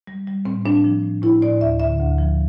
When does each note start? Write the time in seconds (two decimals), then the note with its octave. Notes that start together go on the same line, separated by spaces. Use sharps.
0.07 G3
0.27 G3
0.45 A2 C4
0.65 A2 D4
0.84 F3
1.03 A2
1.22 A2 E4
1.42 A2 D5
1.60 D2 E5
1.80 D3 E5
2.00 D2
2.18 F3